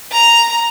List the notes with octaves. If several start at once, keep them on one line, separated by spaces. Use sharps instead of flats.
A#5